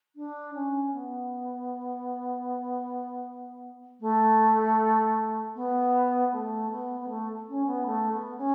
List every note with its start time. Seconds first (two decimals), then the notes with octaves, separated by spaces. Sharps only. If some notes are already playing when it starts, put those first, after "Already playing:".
0.16 D4
0.54 C#4
0.93 B3
4.01 A3
5.55 B3
6.32 A3
6.70 B3
7.00 B3
7.09 A3
7.48 C#4
7.66 B3
7.86 A3
8.12 B3
8.37 C#4